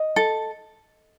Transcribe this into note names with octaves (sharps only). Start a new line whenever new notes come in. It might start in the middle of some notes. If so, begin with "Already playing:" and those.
Already playing: D#5
A4